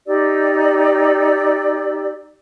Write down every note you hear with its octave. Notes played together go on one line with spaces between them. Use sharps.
D#4 G4 D5 E6